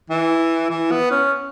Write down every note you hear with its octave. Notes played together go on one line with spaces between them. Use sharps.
E3
E3
B3
C#4